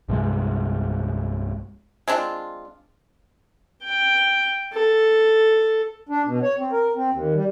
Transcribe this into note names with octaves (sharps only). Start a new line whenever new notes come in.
C2 G2 C3 G#3
G#3 C4 D4 F4
G5
A4
D4
B2
C#5
C4
A#4
C4
D#2
G3